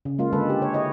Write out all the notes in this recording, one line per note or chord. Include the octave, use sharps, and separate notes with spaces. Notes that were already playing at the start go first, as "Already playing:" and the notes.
C#3
G#3 A#3 F4
D3 G#3 A4 B4
G4
C#5
E4 C#5 D#5